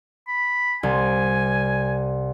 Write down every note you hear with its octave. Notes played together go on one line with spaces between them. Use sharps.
B5
C2 G#5